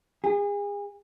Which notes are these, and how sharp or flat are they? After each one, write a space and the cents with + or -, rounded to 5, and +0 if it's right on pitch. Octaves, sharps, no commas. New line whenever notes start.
G#4 -35